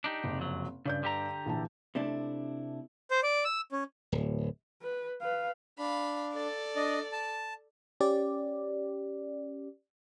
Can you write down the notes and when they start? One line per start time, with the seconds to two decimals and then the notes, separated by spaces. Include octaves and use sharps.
0.04 D4 D#4 G4
0.24 F#1 C3
0.39 F2 F#3
0.85 G2 C#3 D5 G6
1.03 D3 G4 A#5
1.46 A#1 E3 A5
1.95 C3 A3 D4 E4
3.11 C5
3.23 D5
3.45 E6
3.72 C#4
4.12 D1
4.82 B4
5.21 B4 F5
5.79 D4 F5 B5
6.33 A4 D5
6.76 D4 D#5
7.12 A5
8.00 C#4 G4 D5